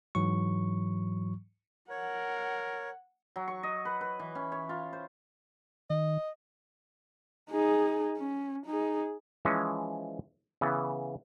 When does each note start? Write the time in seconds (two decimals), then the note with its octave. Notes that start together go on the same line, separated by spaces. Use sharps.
0.15 G#2 E3 F#3 C#6
1.90 A#4 C#5 F#5
3.36 F#3
3.48 C#6
3.63 D#5
3.85 B4
4.01 B4
4.19 E3
4.35 C#4
4.52 C#5
4.69 F4
4.93 C5
5.90 D#3 D#5
7.51 D#4 G#4
8.17 C#4
8.66 D#4 G#4
9.45 E3 F3 G#3 C#4
10.61 C#3 E3 B3